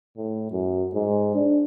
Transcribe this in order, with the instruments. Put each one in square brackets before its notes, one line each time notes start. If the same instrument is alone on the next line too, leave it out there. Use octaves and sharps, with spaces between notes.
[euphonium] A2
F#2
G#2
D4